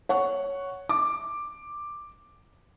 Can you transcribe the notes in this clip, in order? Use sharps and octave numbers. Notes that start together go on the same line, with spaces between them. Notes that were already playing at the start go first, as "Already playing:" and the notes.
C#5 F#5 C#6
D6